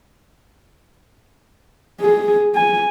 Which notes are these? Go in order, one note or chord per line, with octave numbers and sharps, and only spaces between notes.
G#4
G#5